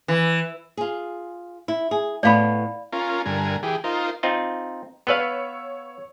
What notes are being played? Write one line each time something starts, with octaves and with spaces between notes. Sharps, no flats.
E3
F4 G#4
E4
G#4
A2 B3 D5 F5 B5
C#4 F4 A#4
G2 D3 A#4 G#5
E3 G4 G#4
D#4 F4 A#4 C5
C4 D#4 F4
B3 B4 C#5 F5 E6 C#7